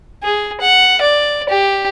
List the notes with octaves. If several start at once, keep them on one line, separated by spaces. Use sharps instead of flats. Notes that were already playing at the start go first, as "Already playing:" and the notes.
G#4
F#5
D5
G4